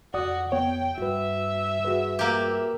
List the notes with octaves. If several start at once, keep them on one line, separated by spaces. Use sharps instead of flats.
F2 F#4 D5 F#5 D#6
B3 C#5 G5
G2 F#4 B4 E5
F#4 G#4 B4
A#3 G4